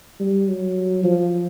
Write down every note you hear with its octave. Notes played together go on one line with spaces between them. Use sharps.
G3
F#3
F3